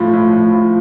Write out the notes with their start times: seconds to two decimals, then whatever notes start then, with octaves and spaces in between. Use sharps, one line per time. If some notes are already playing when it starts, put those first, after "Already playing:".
Already playing: A2 F3
0.13 A2
0.32 A2
0.52 F3